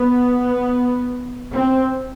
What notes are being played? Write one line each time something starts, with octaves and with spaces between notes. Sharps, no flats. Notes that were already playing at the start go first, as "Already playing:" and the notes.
Already playing: B3
C4